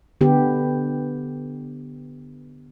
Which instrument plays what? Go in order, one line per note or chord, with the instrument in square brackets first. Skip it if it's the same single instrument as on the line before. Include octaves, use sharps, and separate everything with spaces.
[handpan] D3 B3 G4